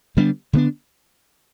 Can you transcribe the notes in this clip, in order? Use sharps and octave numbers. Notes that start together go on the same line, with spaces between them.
D3 G3 B3 D4
D3 G3 B3 D4